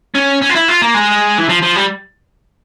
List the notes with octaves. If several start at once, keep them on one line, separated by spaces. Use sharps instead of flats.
C#4
C#4
F4
E4
F4
A#3
G#3
E3
F3
F3
G3